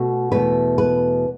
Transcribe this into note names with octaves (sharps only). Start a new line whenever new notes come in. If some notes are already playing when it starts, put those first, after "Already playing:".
Already playing: B2 A3 F#4
E2 B2 A3 B4
B4